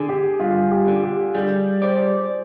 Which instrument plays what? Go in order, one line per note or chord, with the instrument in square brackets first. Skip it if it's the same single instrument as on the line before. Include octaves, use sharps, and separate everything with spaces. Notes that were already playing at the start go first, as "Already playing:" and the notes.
Already playing: [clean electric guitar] D3 [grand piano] G#4
[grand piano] G4
[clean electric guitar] G2 [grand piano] F4
[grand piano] G4
[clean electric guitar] D3
[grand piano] G4
[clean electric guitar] G3 [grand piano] G#4
[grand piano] C5 [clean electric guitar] D5